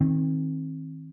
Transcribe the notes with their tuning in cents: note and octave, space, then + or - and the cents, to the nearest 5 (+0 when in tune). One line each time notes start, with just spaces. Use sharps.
D#3 +25 C4 +25